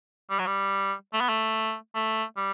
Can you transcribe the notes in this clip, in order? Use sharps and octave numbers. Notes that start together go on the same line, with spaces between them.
G3
F#3
G3
A3
B3
A3
A3
G3